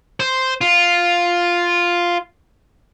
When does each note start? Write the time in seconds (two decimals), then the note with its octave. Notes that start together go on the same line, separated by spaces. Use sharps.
0.20 C5
0.61 F4